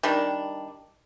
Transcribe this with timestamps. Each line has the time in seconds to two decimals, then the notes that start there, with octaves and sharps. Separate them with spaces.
0.03 D#3 G3 D4